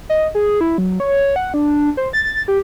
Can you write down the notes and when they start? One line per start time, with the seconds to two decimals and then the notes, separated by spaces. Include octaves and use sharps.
0.09 D#5
0.35 G#4
0.61 E4
0.78 F#3
1.00 C#5
1.36 F#5
1.54 D4
1.97 C5
2.13 A6
2.48 G4